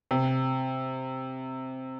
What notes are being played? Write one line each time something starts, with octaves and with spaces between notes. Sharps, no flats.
C3